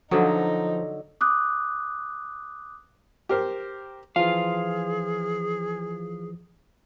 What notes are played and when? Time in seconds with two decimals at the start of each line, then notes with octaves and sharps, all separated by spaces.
0.11 D3 F3 F#3 D#4 A4 C5 D#6
1.21 D6 D#6 F#6
3.29 G4 A#4 C5
4.16 E3 F3 F4 G#4 F5